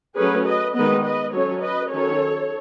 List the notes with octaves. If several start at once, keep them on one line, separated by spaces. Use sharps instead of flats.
F#3 A3 C#4 G#4 B4
B4 D#5
D#3 G#3 B3 B4 D#5
B4 D#5
F#3 C#4 A4 C#5
B4 D#5
D#3 F#3 C#4 A4 C#5